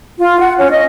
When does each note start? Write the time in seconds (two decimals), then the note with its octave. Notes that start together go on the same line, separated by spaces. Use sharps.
0.19 F4
0.39 F#5
0.58 C#4
0.71 D#5